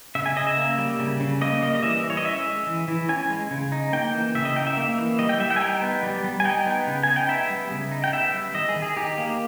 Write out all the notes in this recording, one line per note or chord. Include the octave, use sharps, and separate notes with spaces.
C#3 E5
G#5
C#3 D#5
E5
A#3
G3
C#3
C#3
A#3 D#5
G3 D#5
D#5
E3 E5
E3
C#5
D#5
C#4 E5
G#3
E3
E3
C#4 G#5
G#3
C#3
D#4
A#3 G5
E3
C#3 E5
D#5
D#4 G5
E5
A#3
E3
G3 D#5
G5
G3 E5
G5
G#5
D#4 G5
B3
G3
G3
G#5
D#4 G5
B3
C#3
D#4 G#5
G5
B3 E5
G3
C#3
D#4
G5
B3 E5
G3
D#3 D#5
G#4
D#3
G#4
D#4 G4
A#3